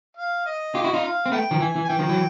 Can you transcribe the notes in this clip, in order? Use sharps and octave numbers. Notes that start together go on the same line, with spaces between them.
F5
D#5
F4 G4
E4 F#4
D#4 F4
F5
C4
A3 B3 G5
D#3 F3
E3 G#5
E3
G#5
E3 G5
D#3 F3
E3 F#3